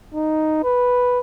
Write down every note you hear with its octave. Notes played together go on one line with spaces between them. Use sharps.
D#4
B4